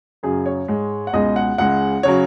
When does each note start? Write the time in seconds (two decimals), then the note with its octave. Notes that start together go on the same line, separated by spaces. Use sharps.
0.23 F#2 C#3 F#3 G#4
0.46 C#5
0.68 G#2 G#3
1.07 F#5
1.13 C#2 B2 G#3 D#5
1.36 F#5
1.58 C#2 C#3 G#3 F#5
2.03 C#3 F#3 C#5